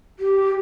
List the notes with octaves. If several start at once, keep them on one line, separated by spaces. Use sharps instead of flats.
G4